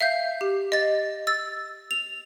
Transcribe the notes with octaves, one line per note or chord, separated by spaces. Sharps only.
E5 F5 G6
G4
D#5 A6
E6 A6
F7